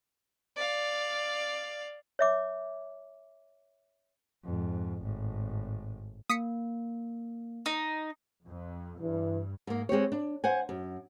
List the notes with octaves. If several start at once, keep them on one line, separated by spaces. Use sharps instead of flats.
D5 F5
C#5 E5 D6
F2 G#2
G#1 A2
A#3 D#6 B6 C#7
D#4
F2
G2 E3
G#2 A#3
G#3 C4 G4 C#5
D4
C5 F#5 G#5
F#2